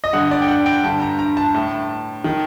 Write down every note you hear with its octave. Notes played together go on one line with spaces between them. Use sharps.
D#5
G2 D3 F#5
D5
G5
F#5
G5
G2 D3 A5
A#5
A#5
A5
A2
D#3